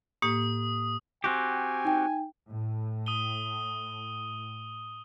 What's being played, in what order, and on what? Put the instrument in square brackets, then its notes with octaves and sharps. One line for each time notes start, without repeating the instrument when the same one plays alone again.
[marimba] A2 A#3 G4 [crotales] D#6
[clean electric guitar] C4 F#4 G4 [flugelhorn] G#5
[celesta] D#4 G5
[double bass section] A2
[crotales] D#6 D#7 G7